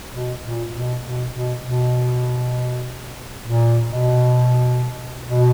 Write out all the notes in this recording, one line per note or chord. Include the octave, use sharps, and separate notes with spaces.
B2
A#2
B2
B2
B2
B2
A#2
B2
B2